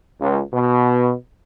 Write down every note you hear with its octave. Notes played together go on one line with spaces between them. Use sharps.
C#2
B2